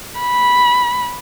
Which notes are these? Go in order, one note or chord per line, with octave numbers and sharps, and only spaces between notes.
B5